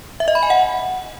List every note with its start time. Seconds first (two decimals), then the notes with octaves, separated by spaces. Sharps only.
0.20 E5
0.28 D#5
0.35 B5
0.43 G#5
0.50 F#5